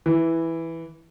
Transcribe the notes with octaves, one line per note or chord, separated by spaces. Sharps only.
E3